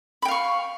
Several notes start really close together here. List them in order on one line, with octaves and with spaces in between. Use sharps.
B5 G5 F5 C#6